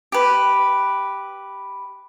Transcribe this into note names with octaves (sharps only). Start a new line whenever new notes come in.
G4 B4